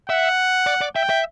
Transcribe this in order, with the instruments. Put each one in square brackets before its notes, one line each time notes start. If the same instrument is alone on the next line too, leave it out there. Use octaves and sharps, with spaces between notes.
[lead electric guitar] E5 [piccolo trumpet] F#5
[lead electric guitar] D5
D5
[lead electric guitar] E5 [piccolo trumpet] G5
[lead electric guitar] E5